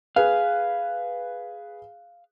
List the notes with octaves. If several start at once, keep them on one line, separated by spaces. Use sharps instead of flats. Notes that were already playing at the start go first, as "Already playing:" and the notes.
G#4 B4 F5